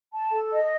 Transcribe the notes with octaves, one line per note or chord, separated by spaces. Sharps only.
A5
A4
D#5